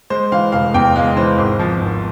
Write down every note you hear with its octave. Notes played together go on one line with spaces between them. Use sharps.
G#3 C5
E3 F5
F1 F5
E2 G5
G#3 F5
E3 C5
G#1
F3
G#1